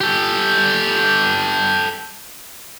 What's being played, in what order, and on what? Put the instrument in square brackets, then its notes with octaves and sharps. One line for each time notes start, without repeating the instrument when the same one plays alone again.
[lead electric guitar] G4 A4